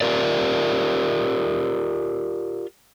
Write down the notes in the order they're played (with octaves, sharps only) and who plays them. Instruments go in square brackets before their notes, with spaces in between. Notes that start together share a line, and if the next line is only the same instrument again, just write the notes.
[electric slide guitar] F4 G4 A#4 D5